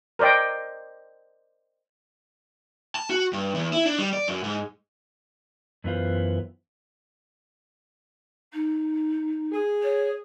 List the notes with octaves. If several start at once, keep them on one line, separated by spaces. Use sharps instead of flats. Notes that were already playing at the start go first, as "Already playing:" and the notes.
A#4 C5 D5 D#5 G5
A5
F#4
G2
E2
E4
D4
G3
D5
F#2
G#2
F#2 E3 B3 F4 C5
D#4
G#4
C#5